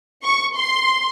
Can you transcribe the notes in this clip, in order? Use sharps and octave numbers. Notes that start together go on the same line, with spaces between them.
C#6
C6